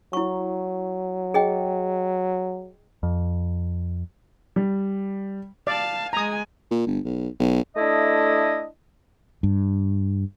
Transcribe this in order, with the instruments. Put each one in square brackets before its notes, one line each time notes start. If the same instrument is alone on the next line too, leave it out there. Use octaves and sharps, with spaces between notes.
[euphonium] F#3 [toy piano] E4 C#6
[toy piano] G#4 D#5 G5
[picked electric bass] F2
[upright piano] G3
[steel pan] D5 [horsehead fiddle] F5 A5
[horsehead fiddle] G#3 G#5 [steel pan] A#5 D#6
[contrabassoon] A#2
G1
B1
B1
[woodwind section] A3 D4 E4 D#5
[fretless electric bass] G2